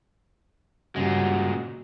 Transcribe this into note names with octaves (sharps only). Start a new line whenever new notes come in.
G2 A#2 C#3 G#3 F#4